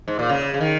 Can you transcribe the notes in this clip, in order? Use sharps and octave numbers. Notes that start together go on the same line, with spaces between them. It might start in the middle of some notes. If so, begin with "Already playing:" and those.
G#2
A#2
C#3
C#3
D#3